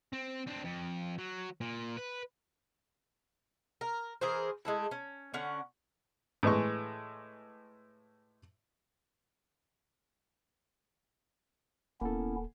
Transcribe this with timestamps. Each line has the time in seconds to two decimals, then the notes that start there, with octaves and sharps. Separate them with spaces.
0.13 C4
0.47 C4 D4
0.65 F2
1.18 F#3
1.61 A#2
1.97 B4
3.81 A#4
4.21 E3 G#4 A#4 C5
4.65 G#3 A3 E4
4.91 C#4
5.34 D3 C#4 F#5
6.43 A2 E3 G#3 C#6
12.01 D#1 A#3 B3 C#4 E4 A4